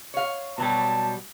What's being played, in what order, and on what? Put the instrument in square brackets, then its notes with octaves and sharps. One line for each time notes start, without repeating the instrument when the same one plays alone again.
[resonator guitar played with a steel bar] C#5 F5
[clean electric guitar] B2 F#3 G3 [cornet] A5